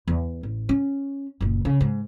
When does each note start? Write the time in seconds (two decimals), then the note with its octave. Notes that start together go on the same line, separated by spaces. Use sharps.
0.08 E2
0.43 A1
0.69 C#4
1.41 F#1 A#2
1.65 C#3
1.81 G#2